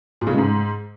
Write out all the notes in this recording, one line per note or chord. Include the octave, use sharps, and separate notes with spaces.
A#2
C#3
G#3
G#2